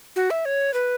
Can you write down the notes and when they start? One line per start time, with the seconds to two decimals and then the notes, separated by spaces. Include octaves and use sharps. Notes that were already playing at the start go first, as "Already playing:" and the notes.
0.16 F#4
0.30 E5
0.45 C#5
0.74 B4